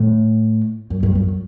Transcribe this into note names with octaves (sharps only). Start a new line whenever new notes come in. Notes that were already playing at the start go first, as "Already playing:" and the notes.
Already playing: A2
F#2
G2
F#2